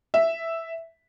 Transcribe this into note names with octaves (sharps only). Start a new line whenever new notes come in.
E5